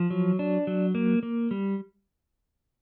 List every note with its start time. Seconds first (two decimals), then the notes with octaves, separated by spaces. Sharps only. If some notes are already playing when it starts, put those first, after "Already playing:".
Already playing: F3
0.10 F#3
0.39 D4
0.67 F#3
0.95 A#3
1.23 A#3
1.51 G3